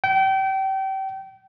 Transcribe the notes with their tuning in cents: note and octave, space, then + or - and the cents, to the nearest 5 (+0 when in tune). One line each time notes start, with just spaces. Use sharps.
G5 -30